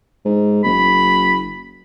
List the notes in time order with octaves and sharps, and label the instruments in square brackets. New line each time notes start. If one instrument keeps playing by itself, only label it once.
[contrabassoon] G#2
[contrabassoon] F#1 [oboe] B5